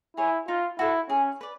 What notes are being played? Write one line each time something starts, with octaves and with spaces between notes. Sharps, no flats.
E4 G#4 C#5
D#4 F4
E4 F#4 A4
C#4 G#4
B4 D5